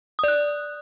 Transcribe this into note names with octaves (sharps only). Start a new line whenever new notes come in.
D5 D#6 F#6